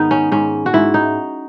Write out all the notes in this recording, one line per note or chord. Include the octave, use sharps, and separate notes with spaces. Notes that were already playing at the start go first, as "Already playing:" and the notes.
Already playing: G#2 D#3 B3 D#4
C#4
G#2 C#4
F#4
G#2 E4
D#4